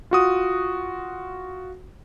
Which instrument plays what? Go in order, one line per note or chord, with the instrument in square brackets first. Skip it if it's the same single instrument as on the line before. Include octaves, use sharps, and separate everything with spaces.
[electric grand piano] F4 F#4 D#6